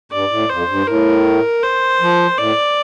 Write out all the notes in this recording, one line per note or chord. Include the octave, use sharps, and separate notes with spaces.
G2 D5
A2
F2 C5
G2
A2 A#4
C5
F3
A2 D5